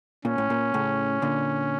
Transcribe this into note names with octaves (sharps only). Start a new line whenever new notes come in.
A#2 C#4
A2
A#2
A2 C#3
A#2 D3